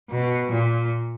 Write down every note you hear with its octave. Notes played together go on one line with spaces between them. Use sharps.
B2
A#2